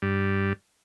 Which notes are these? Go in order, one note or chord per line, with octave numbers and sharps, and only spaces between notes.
G2 G3